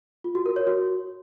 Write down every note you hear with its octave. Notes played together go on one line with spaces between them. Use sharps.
F4
F#4
A#4
C#5
F#4